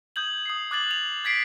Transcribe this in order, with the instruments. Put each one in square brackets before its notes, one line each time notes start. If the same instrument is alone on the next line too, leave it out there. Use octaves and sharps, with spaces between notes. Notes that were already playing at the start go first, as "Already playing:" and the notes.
[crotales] D#6 G6 G#6 F#7
D#6 C7
D6 F#6 G#6 A6 F#7
F7
G#6 A6 B6 C7 D7